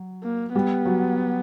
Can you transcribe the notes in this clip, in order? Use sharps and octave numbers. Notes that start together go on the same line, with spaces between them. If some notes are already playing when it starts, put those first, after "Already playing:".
Already playing: F#3
A#3
G3 B3
F#3